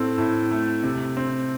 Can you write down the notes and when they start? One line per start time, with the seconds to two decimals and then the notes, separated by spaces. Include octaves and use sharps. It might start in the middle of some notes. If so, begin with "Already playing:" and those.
Already playing: A2 C4 A4
0.18 A2
0.51 A3
0.83 C3
1.17 C4